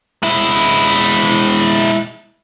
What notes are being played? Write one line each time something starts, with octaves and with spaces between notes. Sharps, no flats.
G#3 E4